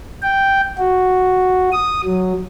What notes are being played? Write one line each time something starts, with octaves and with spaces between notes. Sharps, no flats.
G5
F#4
D#6
F#3